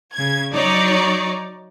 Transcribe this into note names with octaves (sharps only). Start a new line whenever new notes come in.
C#3 G#6
F#3 D#4 C#5 D5